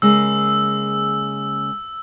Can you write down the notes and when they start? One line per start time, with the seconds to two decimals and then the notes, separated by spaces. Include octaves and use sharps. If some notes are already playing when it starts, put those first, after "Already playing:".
0.02 C#3 G#3 A#3 E6